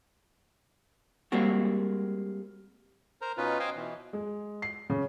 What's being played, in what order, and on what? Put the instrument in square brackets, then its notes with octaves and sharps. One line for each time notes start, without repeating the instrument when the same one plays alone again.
[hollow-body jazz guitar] G3 G#3 A#3 C4 F#4
[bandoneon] A#4 C5 A#5
B2 C#4 D#4 F4 B4
C5 D#5 F5 G5 G#5
B2 E3
[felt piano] G#3
C7
C#3